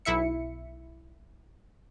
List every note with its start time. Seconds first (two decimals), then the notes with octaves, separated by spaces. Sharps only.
0.05 B1 E4 E5 C#7